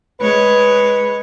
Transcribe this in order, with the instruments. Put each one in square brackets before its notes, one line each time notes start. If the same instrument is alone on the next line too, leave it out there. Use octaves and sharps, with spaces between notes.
[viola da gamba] G#3 C#5 [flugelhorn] B4